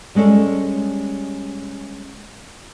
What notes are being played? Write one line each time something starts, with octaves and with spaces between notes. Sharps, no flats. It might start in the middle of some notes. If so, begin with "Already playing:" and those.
G3 G#3 C#4 A4 C#5